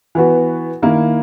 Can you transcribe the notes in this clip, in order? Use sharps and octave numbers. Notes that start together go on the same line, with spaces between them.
E3 B3 F#4
D#3 A#3 E4